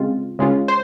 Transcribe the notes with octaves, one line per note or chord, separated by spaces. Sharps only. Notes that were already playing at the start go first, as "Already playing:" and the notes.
Already playing: C#3 G#3 C4 F4
C#3 G#3 C#4 F4
C5